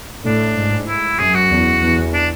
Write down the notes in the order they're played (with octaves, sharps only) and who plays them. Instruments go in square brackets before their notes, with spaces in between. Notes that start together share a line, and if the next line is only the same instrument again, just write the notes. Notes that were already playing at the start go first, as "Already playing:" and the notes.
[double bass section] A2 [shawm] D4
[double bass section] G#2
[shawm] E4
[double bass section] F#2 [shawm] G#4
[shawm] F#4
[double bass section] E2
E2
[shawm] D4